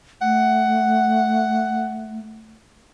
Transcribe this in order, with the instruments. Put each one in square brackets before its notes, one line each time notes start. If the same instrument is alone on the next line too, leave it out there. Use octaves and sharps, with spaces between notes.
[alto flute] A3 [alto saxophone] F#5